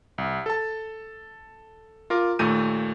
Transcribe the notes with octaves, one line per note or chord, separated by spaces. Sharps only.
C2
A4 A5
F4 A#4 D6
D#2 A#2 A3 G6 D#7